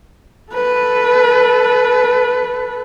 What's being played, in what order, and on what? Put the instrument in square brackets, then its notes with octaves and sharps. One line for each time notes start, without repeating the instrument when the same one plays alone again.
[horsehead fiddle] A4 B4